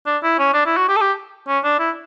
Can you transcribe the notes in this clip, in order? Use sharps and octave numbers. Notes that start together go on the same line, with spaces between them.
D4
E4
C#4
D4
E4
F#4
G4
A4
G4
C#4
D4
E4